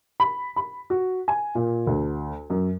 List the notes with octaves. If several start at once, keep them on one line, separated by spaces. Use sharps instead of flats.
B5
B5
F#4
G#5
A#2
D2
F#2